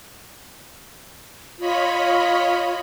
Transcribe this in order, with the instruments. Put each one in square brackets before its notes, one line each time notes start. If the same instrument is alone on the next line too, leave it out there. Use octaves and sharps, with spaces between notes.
[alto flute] F4 [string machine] C#5 D#5 B5